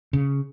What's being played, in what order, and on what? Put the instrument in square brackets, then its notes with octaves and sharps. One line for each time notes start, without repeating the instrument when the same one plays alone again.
[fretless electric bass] C#3